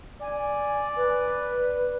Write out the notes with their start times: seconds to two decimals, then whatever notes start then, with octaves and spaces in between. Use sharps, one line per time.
0.21 D5 G#5
0.96 B4